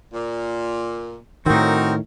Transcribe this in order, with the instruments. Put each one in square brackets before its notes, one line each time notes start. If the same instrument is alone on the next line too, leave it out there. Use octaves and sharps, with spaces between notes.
[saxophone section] A#2
[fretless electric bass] A2 D#3 [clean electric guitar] C4 D#4 [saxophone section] F#4 A#4 C#5